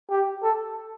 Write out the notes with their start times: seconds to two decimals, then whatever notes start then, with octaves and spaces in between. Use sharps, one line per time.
0.11 G4
0.44 A4